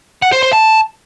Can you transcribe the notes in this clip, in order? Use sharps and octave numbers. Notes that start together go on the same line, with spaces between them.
F#5
C5
C5
A5